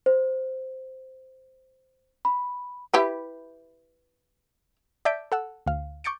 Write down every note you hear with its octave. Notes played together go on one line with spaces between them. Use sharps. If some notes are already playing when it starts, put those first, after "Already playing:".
C5
B5
E4 G4 B4
D5 E5 A5 G6 B6 D7
A4 F#5 E6
D2 F5
C#6 D6 G6 A6 C#7 D7